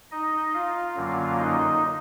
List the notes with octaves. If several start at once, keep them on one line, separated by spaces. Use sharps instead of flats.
D#4 D#5
F4 F5
F#2 D3 F#3 A#3
D#4 D#5